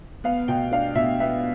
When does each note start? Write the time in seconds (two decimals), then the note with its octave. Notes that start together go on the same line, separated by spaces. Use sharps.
0.24 B3 F5
0.48 B2 G5
0.72 D4 F5
0.95 B2 E5
1.20 B3 E5